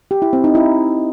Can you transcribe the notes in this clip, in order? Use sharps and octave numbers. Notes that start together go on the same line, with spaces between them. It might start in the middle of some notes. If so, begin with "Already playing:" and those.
G4
E4
C4
D#4
E4